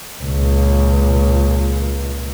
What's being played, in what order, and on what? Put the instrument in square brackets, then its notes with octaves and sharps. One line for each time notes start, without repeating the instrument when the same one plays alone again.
[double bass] C#2 A#2